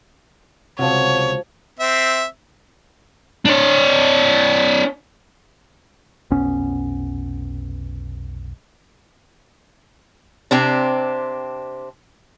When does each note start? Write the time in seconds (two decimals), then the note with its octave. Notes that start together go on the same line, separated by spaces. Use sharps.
0.79 C#2 G#2 C3 F3 F#4 C#5
1.79 C4 E5
3.46 D4 C#5
6.31 F1 B1 B3 C#4
10.51 C3 C4 D4